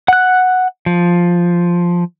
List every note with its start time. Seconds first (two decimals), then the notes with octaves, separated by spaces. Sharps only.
0.08 F#5 F#6
0.86 F3